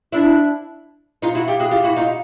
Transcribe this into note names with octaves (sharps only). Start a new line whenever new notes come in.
D4 E4
D#4 F4
E4 F#4
F4 G4
F#4 G#4
F4 G4
E4 F#4
D#4 F4